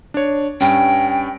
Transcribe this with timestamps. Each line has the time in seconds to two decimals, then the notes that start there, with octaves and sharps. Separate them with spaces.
0.14 D4 C#5
0.61 G2 C#4 G5